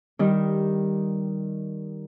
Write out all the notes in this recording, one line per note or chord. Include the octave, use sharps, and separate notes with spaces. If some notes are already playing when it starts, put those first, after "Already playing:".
D#3 G3 D#4